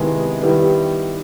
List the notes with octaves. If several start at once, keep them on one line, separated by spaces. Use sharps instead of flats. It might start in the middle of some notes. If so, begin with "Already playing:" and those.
Already playing: C3 D#3 G#3 B3 E4
D#3 G3 B3 E4